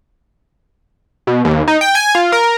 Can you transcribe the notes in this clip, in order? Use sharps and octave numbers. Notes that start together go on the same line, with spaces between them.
B2
D#2
D#4
G5
G#5
F4
A#4